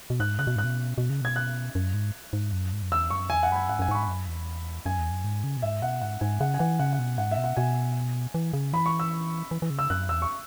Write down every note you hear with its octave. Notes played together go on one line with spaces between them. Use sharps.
B2
G#2 F#6
C#3 F#6
B2
G#2 F#6
B2
B2
C#3
B2 G#6
F#6
F#2
G#2
G#2
F#2
G#2
F#2
E2 E6
F#2 C#6
E2 G#5
F#5
F#2 B5
G#5
G#2 F#5
F#2 G#5
G#2 C#6
B5
F#2
E2
F#2 G#5
E2
F#2
G#2
C#3
B2
G#2 E5
B2 F#5
G#2 F#5
G#2 G#5
C#3 F#5
G#5
E3 F#5
C#3 F#5
F#5
B2
G#2 F#5
E5
B2
F#5
B2 G#5
E3
C#3
E3 B5
C#6
E6
E3
E3
C#3
E6
F#2 F#6
E2 E6
C#6